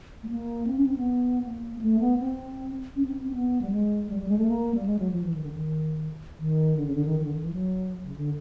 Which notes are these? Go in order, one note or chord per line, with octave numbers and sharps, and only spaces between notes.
A3
A#3
C4
C#4
C4
B3
A#3
A#3
A3
B3
C4
C#4
C4
C4
B3
G3
G#3
G3
G3
G#3
A3
A#3
G3
G#3
F#3
F3
E3
D#3
D3
D#3
D#3
D3
C#3
D3
D#3
D#3
D3
D#3
E3
F#3
C#3
D3